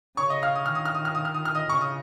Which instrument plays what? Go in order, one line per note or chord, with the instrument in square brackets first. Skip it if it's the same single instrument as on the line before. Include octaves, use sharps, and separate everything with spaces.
[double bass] C#3 [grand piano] C#5 C#6
[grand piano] D#5 D#6
F5 F6
D#6
[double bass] D#3 [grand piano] F6
[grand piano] D#6
F6
D#6
F6
D#6
F6
D#6
F6
D#5 D#6
[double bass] C#3 [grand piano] C#6
[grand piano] D#6